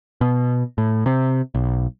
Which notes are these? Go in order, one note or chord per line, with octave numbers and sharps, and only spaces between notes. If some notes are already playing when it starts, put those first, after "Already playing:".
B2
A2
C3
B1